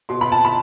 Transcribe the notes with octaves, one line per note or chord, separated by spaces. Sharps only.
B2 C6
B5
A5
B5